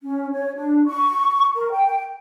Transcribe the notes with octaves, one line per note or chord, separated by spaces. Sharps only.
C#4
C#5
D4
C#6
A#4
G5